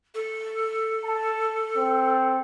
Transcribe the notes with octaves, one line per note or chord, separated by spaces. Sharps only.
A4
A5
C4